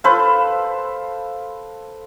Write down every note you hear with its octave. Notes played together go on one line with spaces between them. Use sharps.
A4 B4 C5 F5